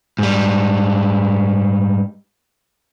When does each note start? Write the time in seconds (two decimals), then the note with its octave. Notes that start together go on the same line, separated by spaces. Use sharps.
0.19 G#2 G3